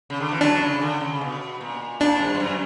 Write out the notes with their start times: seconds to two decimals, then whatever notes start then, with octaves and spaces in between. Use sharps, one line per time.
0.10 C#3
0.20 D3
0.31 E3
0.41 F#3 D4
0.62 C#3
0.82 D3
1.01 C#3
1.21 B2
1.61 A#2
2.00 A#2 D4
2.20 G2
2.35 G2
2.40 F#2